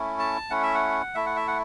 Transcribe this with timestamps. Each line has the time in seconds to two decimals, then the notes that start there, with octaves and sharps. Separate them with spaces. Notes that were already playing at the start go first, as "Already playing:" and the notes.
Already playing: A3 C#4 E4
0.19 A5
0.50 A3 C#4 E4 F#5
0.63 E5
0.74 F#5
1.15 A3 E4 E5
1.26 F#5
1.36 E5
1.47 F#5